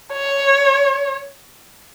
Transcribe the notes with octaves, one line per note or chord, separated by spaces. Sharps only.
C#5